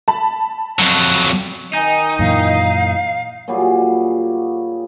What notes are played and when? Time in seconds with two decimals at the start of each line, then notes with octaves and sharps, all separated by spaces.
0.08 A5 B5
0.79 F2 F#3
1.73 D#3 D#4 D#5 G#5
2.19 F#2 A#2 E3 F5
3.48 A#2 F#3 G3 G#4